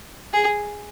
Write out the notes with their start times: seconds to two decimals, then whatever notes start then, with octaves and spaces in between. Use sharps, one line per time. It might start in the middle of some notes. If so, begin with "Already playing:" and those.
0.33 G#4